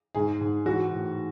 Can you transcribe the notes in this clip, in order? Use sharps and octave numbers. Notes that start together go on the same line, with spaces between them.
G#2 G#4
G#2
E3 F#4
A2